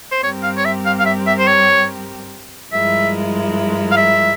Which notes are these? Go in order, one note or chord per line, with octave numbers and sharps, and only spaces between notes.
C5
G2 G3 C4 G4 A#4 C#5
F5
C#5
E5
F5
F5
E5
E5
C5
C#5
G2 F3 G#3 E4 A#4 E5
F5
E5